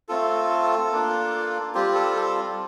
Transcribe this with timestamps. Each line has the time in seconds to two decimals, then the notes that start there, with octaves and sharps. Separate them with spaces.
0.09 A3 C4 F4 A4
0.92 A#3 D4 F4
1.75 G3 C4 F4 G4
1.94 A4
2.16 A4